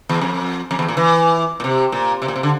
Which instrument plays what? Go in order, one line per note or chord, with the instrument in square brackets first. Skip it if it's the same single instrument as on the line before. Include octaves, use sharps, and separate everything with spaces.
[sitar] E2
F2
F2
E2
A#2
E3
A#2
C3
A#2
C3
A#2
C3
D3